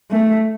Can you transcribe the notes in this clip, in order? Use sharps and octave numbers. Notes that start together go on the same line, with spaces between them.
A3